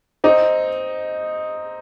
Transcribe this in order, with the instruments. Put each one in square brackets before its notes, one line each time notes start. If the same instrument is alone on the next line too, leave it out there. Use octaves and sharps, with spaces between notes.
[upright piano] C4 D#4